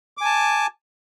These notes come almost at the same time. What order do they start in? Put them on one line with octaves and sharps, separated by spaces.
D6 G#5 A5